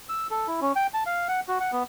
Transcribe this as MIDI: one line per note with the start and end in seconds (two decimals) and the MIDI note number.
0.09 0.27 88
0.31 0.47 69
0.48 0.60 64
0.61 0.72 61
0.76 0.87 79
0.94 1.03 81
1.06 1.28 77
1.28 1.40 78
1.48 1.58 66
1.60 1.71 78
1.72 1.83 59